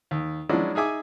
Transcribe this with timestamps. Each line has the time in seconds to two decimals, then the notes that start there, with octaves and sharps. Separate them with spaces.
0.11 D#2
0.49 F3 F#3 G#3 C#4 D4 E4
0.75 D#4 G#4 E5 G#5 D6